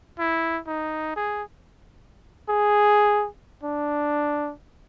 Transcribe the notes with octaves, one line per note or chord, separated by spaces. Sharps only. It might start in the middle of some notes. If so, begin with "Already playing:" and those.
E4
D#4
G#4
G#4
D4